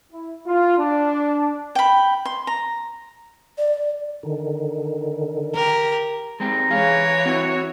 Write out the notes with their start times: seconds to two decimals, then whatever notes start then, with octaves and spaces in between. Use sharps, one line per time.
0.11 E4
0.45 F4
0.78 D4
1.75 G5 B5
2.25 C6
2.47 A#5
3.58 D5
4.23 D3 D#3
5.55 G4 A#4
6.40 G#3 C4 G4 A#5
6.71 E3 G#4 C#5 F5
7.26 C4 E4 F#4